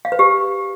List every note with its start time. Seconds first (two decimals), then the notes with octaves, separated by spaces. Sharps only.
0.05 F5
0.12 B4
0.19 G4